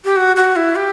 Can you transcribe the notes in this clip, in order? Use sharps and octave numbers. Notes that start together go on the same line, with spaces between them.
G4
F#4
F#4
E4
G4